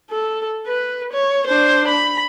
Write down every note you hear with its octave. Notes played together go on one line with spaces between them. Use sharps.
A4
B4
C#5
D4 C5
B5